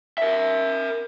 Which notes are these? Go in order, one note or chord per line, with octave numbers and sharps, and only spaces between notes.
A#4 E5